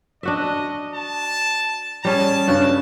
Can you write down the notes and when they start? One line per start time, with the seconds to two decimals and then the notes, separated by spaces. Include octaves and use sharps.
0.23 D4 F#4 D#5 E5
0.95 A5
2.05 G3 C#4 G#4 A5
2.48 G2 C#3 F#4